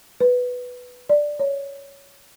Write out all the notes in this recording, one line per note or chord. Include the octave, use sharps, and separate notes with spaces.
B4
D5
C#5